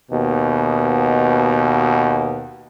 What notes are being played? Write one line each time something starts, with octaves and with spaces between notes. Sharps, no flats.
D#2 B2